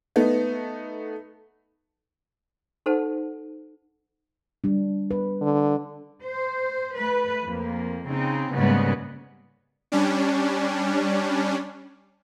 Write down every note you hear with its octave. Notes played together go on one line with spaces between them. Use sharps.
A3 B3 D#4
D#4 A4 C5 F#5 A5
G3 D4
B4
D3
C5
A3 B4
F2 A#3
C#3 C4 D#4
G#2 C#3 G3 G#3 A#3 B3
G3 C#4 D4